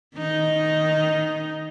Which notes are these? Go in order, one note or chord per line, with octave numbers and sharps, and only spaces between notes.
D#3 D#4